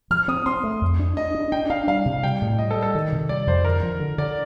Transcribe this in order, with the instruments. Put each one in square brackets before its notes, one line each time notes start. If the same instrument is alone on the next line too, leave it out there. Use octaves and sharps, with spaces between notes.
[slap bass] F3 [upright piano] F6
[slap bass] C4 [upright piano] D#6
[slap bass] C4 [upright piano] C6
[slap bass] A3
F2
D4
[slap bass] D4 [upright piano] D#5
[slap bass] D4
[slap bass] D4 [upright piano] G5
[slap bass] D4 [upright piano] F5
[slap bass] G3 [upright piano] F5
[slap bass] C3
[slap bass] G3 [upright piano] G5
[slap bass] A2
[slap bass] G3 [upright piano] D#5
[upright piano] A4
[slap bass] G3
[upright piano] A4
[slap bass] D#3
C3
[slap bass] G3 [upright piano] D5
[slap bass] F2 [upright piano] C5
[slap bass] D3 [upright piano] A#4
[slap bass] F3
D3
[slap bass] D3 [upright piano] D5